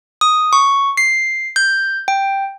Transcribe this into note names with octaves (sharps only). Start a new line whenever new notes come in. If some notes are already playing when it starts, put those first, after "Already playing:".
D#6
C#6
C7
G6
G5